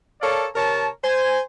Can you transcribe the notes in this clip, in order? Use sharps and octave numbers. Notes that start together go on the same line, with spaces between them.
A4 A#4 C#5 D5 F5 A5
C3 A#4 C#5 A5
C5 G#5